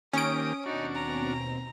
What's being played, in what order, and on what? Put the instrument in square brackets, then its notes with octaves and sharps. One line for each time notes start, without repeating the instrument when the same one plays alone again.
[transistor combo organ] D#3 A#3 G4 [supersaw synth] C#4 D7 [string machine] C5 [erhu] D#6
[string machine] D#2 B2 C4 [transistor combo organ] D4 F#4 [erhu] D#4
[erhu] A#5